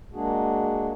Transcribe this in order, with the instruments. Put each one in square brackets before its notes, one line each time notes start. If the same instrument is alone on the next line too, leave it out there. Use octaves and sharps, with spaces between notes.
[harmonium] G#3 A#3 D4 F#4 G#4